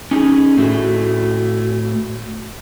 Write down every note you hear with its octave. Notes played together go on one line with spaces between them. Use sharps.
C#4 D#4 G4 G#4
A2 A3 F#4